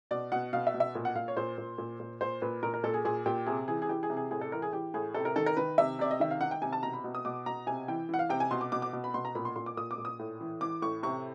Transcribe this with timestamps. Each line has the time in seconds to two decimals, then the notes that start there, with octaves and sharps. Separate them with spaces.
0.11 B2 D5
0.32 B2 F#5
0.53 B2 F5
0.67 E5
0.74 B2
0.80 E5
0.95 A#2
1.05 F#5
1.15 A#2 F5
1.28 C#5
1.37 A#2 C5
1.58 A#2
1.78 A#2
2.00 A#2
2.21 A#2 C5
2.42 A#2 B4
2.63 A#2 A#4
2.74 A#4
2.83 A#2 A4
2.94 G#4
3.05 A#2 G#4
3.26 A#2 G4
3.46 C3 G#4
3.68 E3 G#4
3.82 G#4
3.89 E3 G4
4.03 G#4
4.10 C3
4.17 G#4
4.31 A2 G#4
4.41 A4
4.52 E3 A#4
4.62 G#4
4.73 E3 G4
4.94 A2 G#4
5.14 C3 A4
5.25 A#4
5.36 D#3 A4
5.46 A#4
5.57 D#3 B4
5.78 C3 E5
5.99 C3 D5
6.11 D#5
6.20 D#3 E5
6.31 F5
6.41 D#3 F#5
6.51 G5
6.62 C3 G#5
6.73 A5
6.83 B2 A#5
6.93 B5
7.04 B2
7.15 D#6
7.25 B2 D6
7.46 B2 A#5
7.67 C3 G#5
7.88 E3 G5
8.09 E3 F#5
8.19 F5
8.30 C3 G5
8.40 G#5
8.51 B2 C6
8.61 D6
8.72 B2 D6
8.82 D6
8.93 B2
9.04 B5
9.14 B2 C6
9.25 A#5
9.35 A#2 B5
9.45 C6
9.56 A#2 C6
9.66 D6
9.77 A#2 D#6
9.91 D6
9.98 A#2
10.05 D#6
10.19 A2
10.41 E3
10.61 E3 D6
10.82 A2 C#6
11.03 C3 C#6